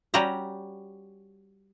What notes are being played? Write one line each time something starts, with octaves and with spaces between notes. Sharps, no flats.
G3 C#4 F#4 G4 A#5